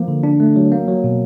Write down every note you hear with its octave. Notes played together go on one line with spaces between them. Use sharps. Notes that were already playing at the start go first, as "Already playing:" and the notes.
Already playing: F3 A#3
D3
D4
A3
F#3
A#3
F#3
B2